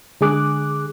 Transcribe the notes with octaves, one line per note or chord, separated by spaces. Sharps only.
D3 G#3 G#4 D6 F#6